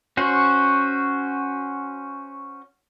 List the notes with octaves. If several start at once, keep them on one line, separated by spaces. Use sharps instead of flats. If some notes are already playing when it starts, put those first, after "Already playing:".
C#4 F#4 C5